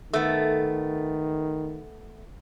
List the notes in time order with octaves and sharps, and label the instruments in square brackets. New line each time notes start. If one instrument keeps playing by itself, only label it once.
[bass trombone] D#3 [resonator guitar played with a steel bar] A3 B3